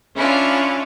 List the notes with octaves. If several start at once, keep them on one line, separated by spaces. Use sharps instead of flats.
C#4 D4 E4 F4